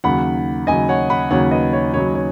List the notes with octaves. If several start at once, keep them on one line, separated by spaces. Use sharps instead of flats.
D#2 C#3 F#3 F#5 B5
D#2 C#3 F#3 D#5 G#5
C#5 F#5
F#5 B5
D#2 C#3 F#3 C#5 F#5
B4 D#5
C#5
D#2 C#3 F#3 C#5
C#5